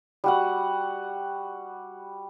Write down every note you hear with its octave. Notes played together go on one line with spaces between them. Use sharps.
G3 F#4 F#5